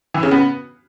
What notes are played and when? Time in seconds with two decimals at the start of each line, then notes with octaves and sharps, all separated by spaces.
0.14 E3
0.23 C#3
0.31 B3